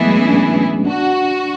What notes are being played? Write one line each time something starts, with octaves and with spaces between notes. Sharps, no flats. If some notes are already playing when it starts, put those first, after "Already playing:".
Already playing: E3 F#3 G#3 A3 B3 E4 G#4
C#4
D4
D4 F#4